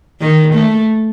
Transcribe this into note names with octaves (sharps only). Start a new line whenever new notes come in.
D#3
A3